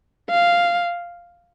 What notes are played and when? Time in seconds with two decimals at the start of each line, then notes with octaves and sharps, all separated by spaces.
0.30 F5